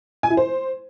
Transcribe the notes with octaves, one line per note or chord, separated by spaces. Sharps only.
G#5
E4
C5